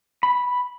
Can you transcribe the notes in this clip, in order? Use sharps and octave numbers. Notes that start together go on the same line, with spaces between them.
B5